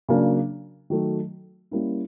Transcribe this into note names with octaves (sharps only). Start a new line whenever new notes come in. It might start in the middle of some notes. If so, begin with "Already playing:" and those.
C#3 F#3 A#3 D4
D#3 F#3 A3
G3 A#3 C#4 E4